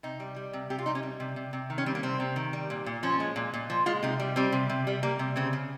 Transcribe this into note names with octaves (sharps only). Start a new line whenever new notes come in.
C3 D#4
G3
G3
C3
C3 G4
F4
G3 D#4
C#4
G3
C3
C3
C3
D#3
C#4
G3 C4
A#3
C3 C4
C3
D#3
G3
A#2
A#2
F3 C#4
G#3
A#2
A#2
F3
G#3 F4
C3 D#4
G3
G3 C4
C3
C3
G3
G3 A#3
C3
C#3 C4
C#3